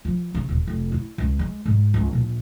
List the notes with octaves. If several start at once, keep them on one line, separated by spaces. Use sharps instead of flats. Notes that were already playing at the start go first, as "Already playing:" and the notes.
F3
C#3
D#1
F1
E4
C#2
G#3
G#2
C#2
A#1